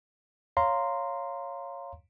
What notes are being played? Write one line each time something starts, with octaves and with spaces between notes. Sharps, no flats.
C#5 F5 A#5 C6